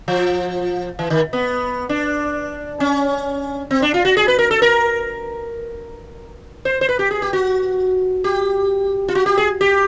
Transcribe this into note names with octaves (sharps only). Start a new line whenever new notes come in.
F3
E3
D#3
B3
D4
C#4
C4
D4
F4
F#4
G#4
B4
A#4
A4
A#4
C5
C5
B4
G4
G#4
G4
F#4
G4
F4
F#4
G4
G#4
G4